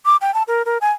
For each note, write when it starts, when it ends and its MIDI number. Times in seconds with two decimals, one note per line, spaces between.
0.06 0.17 86
0.21 0.33 79
0.34 0.43 81
0.48 0.62 70
0.66 0.78 70
0.81 0.91 80